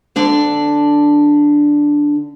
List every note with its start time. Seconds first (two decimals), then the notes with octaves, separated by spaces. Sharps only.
0.16 D3 D4 D5